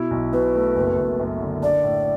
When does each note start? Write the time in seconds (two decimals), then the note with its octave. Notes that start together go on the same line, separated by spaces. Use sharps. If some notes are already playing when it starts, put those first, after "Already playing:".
Already playing: B2 E4
0.11 B1
0.33 B2 B4
0.55 A3
0.76 F#1
0.98 F#1
1.19 F#2
1.41 D3
1.62 D4 D5
1.84 A2